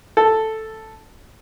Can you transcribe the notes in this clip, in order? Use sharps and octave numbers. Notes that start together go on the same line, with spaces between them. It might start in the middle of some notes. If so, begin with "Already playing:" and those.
A4